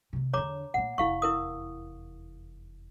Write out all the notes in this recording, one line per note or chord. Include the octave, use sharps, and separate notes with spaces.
C3 D#3
E2 D3 C#5 A#5 D6
A#2 A#3 F#5
F1 E2 E4 F5 C#6
E4 A#4 D#6